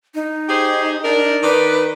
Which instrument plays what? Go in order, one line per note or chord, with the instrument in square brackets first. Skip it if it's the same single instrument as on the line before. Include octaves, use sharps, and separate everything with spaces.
[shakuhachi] D#4
[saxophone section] G4 G#4 C5
D4 A#4
[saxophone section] D#3 D5 [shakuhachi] B4